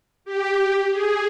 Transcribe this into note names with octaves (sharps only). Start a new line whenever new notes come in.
G4
G#4